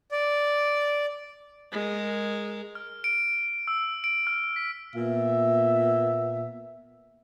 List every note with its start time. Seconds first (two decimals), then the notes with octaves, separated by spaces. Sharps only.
0.12 D5
1.72 G#3 A#4
2.75 F6
3.04 D7
3.68 E6
4.04 D7
4.27 F6
4.56 B6
4.95 A#2 B3 E5